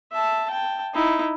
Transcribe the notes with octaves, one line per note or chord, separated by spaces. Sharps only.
E5 A5
G5 A5
D#4 E4